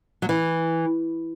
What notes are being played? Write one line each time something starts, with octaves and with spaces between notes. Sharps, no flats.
F#3
E3